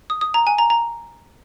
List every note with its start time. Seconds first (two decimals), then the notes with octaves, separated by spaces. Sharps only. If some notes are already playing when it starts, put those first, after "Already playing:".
0.10 D#6
0.21 D#6
0.34 A#5
0.47 G#5
0.58 A#5
0.70 A#5